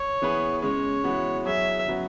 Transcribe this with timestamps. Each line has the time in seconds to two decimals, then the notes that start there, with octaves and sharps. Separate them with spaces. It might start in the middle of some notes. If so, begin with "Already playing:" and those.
Already playing: C#5
0.22 E3 B3 G#4 B4
0.62 C#3 G#3 C#4 C#5
1.04 E3 G#3 B3 F#4
1.46 F#3 E4 G#4 C#5 E5
1.87 C#3 F#3 B3 F#4